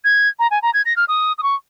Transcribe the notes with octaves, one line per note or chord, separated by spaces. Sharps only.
G#6
A#5
G#5
A#5
G#6
A#6
F6
D#6
D#6
C#6